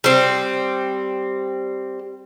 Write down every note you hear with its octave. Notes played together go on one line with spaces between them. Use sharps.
G3 C4